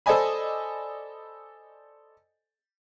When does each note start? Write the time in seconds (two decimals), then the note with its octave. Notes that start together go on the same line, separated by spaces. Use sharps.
0.06 A4 C5 D5 D#5 G#5 B5